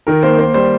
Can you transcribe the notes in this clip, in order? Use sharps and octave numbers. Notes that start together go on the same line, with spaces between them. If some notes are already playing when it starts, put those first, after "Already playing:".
D#3 A#4
A#3 C5
A#3 C5
G3 C5